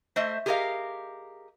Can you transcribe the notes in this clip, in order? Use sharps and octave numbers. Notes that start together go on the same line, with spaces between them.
A3 C5 D#5 E5
G4 G#4 A#4 D5 D#5 F5